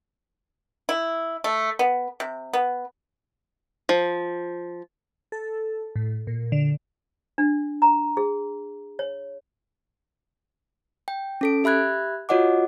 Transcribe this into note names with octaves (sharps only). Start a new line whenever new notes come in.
E4
A3
B3
C3
B3
F3
A4
A2
A#2
D3
D4
A#5
G#4
C#5
G5
C#4 A4 D7
G4 E5 B5 F#6 G#6
F4 F#4 C#5 D#5 F#5 D6